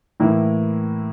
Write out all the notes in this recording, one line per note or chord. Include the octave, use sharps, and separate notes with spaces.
A2 E3 A#3 E4